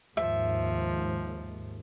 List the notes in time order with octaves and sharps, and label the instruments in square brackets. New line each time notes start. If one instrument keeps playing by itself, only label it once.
[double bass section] D#2 G#2 [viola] F3 [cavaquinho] E5